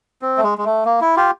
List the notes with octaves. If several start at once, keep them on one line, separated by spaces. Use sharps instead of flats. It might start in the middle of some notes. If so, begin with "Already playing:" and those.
C4
A3
G#3
G#3
A3
A#3
E4
F4 G4